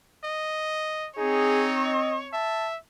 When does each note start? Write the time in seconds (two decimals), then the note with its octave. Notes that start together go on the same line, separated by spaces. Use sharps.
0.24 D#5
1.18 C4 D#4 G#4 C#5
1.86 D#5
2.33 E5 A5